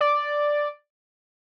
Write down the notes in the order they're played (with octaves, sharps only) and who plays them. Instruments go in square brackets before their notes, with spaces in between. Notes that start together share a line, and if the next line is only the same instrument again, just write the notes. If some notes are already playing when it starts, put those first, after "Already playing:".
[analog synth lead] D5